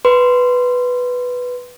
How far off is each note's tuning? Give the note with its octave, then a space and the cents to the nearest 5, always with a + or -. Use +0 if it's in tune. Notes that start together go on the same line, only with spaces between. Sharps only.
B4 +0 C6 -10